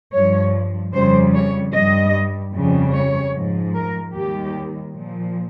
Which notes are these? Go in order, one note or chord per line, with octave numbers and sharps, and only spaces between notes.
G2 F3 C#5
F2 C#3 G3 C5
C#5
G2 G3 D#5
F2 C#3 G3
C#5
G#2 F3
A#4
D#2 D#3 G3 G4
A#2 F3